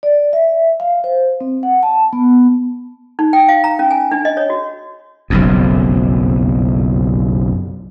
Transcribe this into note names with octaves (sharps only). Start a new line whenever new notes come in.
D5
E5
F5
C5
C4
F#5
A5
B3
D#4
G5
F5
A#5
C#4
G#5
D4
D#5
C#5
F#4
F#1 B1 F2